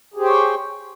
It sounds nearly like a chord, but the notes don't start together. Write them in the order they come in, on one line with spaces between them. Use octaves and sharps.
G#4 G4 C5 G5 C#5